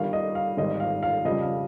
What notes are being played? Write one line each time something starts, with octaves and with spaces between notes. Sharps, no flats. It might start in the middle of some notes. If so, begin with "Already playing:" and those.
Already playing: G1 G2 D#3 G3 F5
D#5
F5
G#1 G#2 D#3 G3 D#5
F5
F5
F2 C#3 G3 D#5
F5